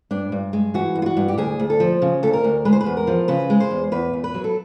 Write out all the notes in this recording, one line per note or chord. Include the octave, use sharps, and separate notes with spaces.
G2 D4
G2
G#3
E3 F#4
G2
F4
F#4
G2
G4
D2 G#4
D2
A4
F3
C#3
D2 A4
A#4
D2
G#3 B4
C5
B4
E2
A#4
F3
C#3 B4
G#3
C5
E2
E2 B4
E2
B4
F#3
A4